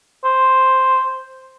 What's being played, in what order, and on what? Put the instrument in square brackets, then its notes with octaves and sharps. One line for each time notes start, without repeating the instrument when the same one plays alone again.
[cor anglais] C5